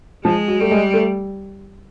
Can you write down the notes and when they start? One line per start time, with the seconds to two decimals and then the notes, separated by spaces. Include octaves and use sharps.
0.25 F3 G#3
0.48 F#3
0.59 G3 A3
0.71 G#3
0.94 A3